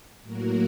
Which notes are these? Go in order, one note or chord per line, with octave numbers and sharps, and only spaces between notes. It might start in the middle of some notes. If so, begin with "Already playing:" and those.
A2 F#3 A#3 F#4 A#4